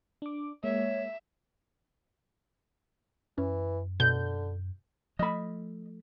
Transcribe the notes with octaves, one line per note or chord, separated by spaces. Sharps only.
D4 D6
G#3 A#3 C#5 E5
F#2 E3 C#4
B2 D3 G6
F3 A3 D#5 B5